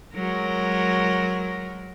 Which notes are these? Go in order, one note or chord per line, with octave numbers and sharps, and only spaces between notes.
F#3 G#3 A#4